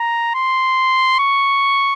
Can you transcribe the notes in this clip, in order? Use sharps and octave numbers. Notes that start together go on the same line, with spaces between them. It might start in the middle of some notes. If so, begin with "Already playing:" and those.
Already playing: A#5
C6
C#6